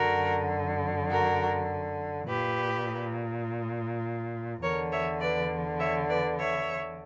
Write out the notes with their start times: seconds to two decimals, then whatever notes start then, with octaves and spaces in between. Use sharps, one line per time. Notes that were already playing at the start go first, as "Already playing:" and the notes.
Already playing: F#2 D3 F#4 A#4
1.10 F#4 A#4
2.27 A#2 G4 B4
4.62 E2 D3 A#4 C#5
4.91 C#5 E5
5.20 B4 D5
5.79 C#5 E5
6.09 B4 D5
6.38 C#5 E5